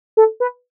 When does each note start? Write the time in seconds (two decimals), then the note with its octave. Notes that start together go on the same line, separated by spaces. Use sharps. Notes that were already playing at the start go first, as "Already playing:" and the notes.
0.17 A4
0.40 B4